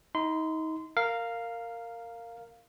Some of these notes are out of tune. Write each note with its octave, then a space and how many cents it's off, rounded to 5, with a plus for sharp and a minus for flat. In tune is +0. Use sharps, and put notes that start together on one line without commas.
D#4 +30 C6 -25
A#4 -15 F5 +0